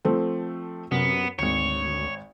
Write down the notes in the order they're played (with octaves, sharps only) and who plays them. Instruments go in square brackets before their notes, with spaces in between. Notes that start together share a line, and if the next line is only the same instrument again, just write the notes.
[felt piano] F3 A3 C4
[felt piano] F#2 [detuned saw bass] C3 [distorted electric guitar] B3
[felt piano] G#1 C#7 [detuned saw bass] D2 [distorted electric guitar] C#5